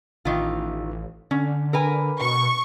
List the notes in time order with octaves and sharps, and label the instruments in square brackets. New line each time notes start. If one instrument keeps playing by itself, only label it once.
[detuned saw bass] A1 [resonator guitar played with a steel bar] D#3 E3 F4
[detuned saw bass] D3 [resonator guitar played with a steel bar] C#4
[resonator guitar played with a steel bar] A#4 B4 G#5
[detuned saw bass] B2 [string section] C#6